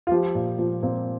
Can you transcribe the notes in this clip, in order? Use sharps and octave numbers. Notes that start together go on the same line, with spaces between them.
F4
F3 G4
A#2
F3
A#2 C4